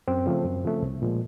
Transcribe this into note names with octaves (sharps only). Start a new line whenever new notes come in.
F#2 C4
C#3 F3 A3
F#2
C#3 F3 A3
C2
A#2 F3 G#3